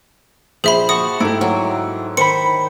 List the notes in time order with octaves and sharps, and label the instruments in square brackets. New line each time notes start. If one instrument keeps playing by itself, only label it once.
[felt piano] A#1 [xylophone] G#4 E5 B5 [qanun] C5
[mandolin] F#4 [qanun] A5 [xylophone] D#6
[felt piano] G#2 A3 [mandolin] E4 G4
[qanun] F#3
[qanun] D#3 [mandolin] C5 B5 [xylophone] C#7